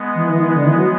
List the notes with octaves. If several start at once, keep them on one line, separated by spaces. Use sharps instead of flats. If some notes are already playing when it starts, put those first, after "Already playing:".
Already playing: G#3 B3
E3
E3 G#3 B3
E3
D3
E3
F#3